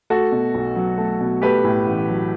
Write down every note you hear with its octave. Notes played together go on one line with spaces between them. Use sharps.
A3 F#4 A4
B2
B1
F#3
A3
B2
A3 G4 B4
A2
A1
F#3